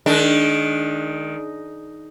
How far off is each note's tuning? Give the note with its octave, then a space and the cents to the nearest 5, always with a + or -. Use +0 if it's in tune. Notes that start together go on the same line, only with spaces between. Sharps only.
D#3 +0 G#3 +35 D4 +0